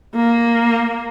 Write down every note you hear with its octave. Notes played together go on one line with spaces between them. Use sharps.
A#3